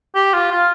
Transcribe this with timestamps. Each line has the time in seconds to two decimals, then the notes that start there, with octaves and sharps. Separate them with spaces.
0.15 G4
0.33 F4
0.51 F4